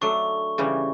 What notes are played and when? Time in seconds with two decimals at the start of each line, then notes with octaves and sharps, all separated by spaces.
0.01 F#3 A3 D4 C#6
0.58 C#3 E3 G3 C#4